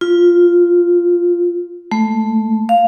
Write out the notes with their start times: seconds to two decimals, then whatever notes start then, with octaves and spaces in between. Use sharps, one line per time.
0.01 F4
1.92 A3
2.69 F5